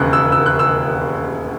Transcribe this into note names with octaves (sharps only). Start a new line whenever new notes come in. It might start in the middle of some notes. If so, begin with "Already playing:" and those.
Already playing: E1 D#2 C#3 F#6
E6
E6
F#6
E6